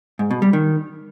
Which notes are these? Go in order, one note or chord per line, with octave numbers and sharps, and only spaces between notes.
G#2
B2
G3
D#3